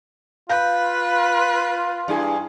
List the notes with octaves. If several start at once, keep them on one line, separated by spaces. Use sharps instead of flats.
F4 B4 F5 G6
G2 E4 G#4